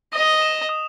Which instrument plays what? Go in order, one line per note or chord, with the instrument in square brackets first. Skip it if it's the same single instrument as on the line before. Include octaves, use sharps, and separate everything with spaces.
[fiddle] D#5 [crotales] D#6
[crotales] E7
D#6